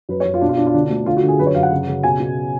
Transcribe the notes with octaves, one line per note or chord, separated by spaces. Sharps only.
F#2 B4
C#5
F#2
F4
B2 D4
F4
B2 D4
F4
D3 D4
D4
D2
D3 F4
F#4
D3
G#4
F#2 B4
C#5
F#2 F5
F#5
C#3
C#3
B2 G#5
B2